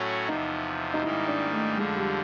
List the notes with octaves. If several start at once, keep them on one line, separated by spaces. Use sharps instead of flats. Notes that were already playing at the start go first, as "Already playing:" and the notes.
Already playing: A2 F#3 A3 C#4 F#4
E2 C3 F3 D#4
D#4
G#2 D#3 G3 A#3 E4
D4
A3
F2 D3 F3 G#3
G3